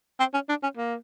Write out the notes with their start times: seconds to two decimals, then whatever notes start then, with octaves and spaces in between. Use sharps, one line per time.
0.19 C4
0.34 C#4
0.49 D4
0.63 C#4
0.77 A#3